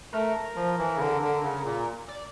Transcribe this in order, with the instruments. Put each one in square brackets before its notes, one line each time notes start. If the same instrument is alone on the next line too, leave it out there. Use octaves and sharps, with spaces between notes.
[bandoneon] A3 [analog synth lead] A#4
[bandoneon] F3
E3
C#3
D3
D3
C#3
A#2
[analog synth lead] D5